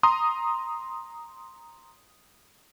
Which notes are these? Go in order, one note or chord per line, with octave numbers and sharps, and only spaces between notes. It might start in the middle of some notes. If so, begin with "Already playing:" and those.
A#5 C6 D#6